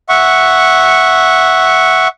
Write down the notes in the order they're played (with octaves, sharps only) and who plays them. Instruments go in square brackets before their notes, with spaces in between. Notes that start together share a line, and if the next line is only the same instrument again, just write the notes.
[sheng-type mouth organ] E5 F#5 C#6